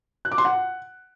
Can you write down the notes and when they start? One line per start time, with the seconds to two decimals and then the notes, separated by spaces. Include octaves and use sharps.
0.25 F#6
0.32 D6
0.38 C6
0.45 F#5